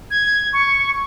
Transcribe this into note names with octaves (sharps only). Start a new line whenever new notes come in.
G#6
C#6